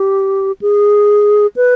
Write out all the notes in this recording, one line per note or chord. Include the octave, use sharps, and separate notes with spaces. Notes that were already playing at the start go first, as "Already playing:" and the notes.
Already playing: G4
G#4
B4